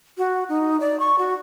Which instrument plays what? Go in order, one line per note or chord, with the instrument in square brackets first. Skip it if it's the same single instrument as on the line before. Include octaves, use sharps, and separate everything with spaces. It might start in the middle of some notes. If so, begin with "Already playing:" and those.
[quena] F#4
D#4
D5
C#6
F#4